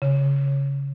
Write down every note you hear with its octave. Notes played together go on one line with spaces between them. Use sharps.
C#3